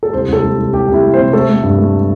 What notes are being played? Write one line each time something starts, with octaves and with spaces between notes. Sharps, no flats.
A4
C2 C5
C2 A4
C2
C2
C2 G4
C2
E4
A3
C3 C5
A3 A4
A3
G2
A3